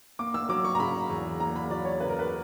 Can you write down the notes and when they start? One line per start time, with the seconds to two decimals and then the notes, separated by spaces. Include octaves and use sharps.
0.19 A#3 D6
0.34 E6
0.49 F#3 D6
0.64 C#6
0.75 A#5
0.79 C#3 B5
1.10 E2
1.40 A#3 A#5
1.56 B5
1.70 F#3 D5
1.85 C#5
2.00 C#3 B4
2.09 A#4
2.19 B4